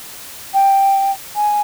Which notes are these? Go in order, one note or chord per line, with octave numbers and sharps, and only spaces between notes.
G5
G#5